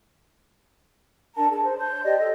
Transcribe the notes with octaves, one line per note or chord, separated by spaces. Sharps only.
D4 A#4 A5 A#5
G#4 A5
C5
C#5 C6 G6
G4 D5 D#5
A4 C#5 D#5